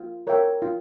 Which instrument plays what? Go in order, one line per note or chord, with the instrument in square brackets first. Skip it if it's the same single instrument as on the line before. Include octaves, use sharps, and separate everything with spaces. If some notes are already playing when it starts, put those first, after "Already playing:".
Already playing: [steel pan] F4
A#4 C#5 E5 G5
F4